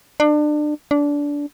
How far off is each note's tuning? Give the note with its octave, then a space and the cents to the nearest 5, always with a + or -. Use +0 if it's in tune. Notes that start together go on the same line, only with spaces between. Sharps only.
D4 +30
D4 -20